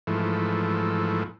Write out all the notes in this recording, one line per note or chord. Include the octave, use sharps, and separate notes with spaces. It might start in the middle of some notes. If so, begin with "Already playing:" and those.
G#2 E3 F3 A3